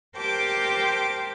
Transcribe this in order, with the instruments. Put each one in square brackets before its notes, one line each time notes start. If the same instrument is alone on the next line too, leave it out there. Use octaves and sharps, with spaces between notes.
[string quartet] G4 A#4 C5 G5 A5 D6